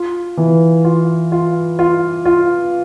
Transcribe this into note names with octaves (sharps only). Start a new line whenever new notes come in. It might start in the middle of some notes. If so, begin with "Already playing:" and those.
Already playing: F4
E3
F4
F4
F4
F4